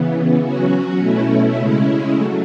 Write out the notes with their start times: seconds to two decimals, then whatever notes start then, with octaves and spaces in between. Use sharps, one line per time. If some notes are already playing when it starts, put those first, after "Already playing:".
Already playing: C#3 E3 B3
0.42 F#3 C#4 F#4
0.99 B2 A3 C#4 E4
1.55 C#3 G#3 C#4 E4
2.12 F#3 A3